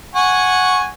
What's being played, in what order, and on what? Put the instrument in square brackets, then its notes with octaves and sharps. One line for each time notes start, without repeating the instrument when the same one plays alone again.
[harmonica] F#5 G#5 C#6